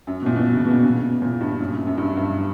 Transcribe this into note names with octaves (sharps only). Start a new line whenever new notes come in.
F#2
B2
A#2
B2
C#3
B2
C#3
A#2
G2
F#2
F#2
G2
G2